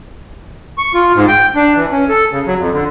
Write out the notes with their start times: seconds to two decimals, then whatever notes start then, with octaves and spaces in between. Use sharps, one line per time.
0.78 C#6
0.94 F4
1.15 G#2
1.28 G5
1.55 D4
1.75 E3
1.91 C#4
2.09 A4
2.31 C#3
2.47 F#3
2.58 F2
2.71 D3